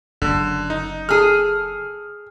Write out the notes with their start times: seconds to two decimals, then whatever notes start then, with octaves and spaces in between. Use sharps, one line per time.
0.22 F#1 F#2 D3
0.70 D#4
1.09 G#4 A4 F6